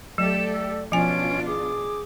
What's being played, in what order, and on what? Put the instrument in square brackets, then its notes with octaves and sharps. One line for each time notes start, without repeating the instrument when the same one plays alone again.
[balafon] F#3 [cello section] A3 G4 A4 [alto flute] D5 [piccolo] E7
[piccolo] E6
[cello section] B2 D4 F4 [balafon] F3 G#5 [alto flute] C#4 [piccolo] D7
[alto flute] G#4 [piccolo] D6